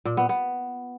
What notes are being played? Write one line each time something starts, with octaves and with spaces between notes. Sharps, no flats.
A#2
B3
B3